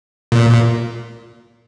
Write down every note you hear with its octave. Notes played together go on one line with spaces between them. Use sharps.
A#2